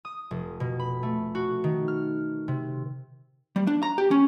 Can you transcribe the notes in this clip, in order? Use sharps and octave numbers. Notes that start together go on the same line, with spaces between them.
D#6
F1
B2
B5
A3
F#4
D#3
F6
C3
G3
D4
A#5
G4
C#4